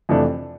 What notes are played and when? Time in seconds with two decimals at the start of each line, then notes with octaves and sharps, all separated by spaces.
0.09 F2 C3 E3 A3 D4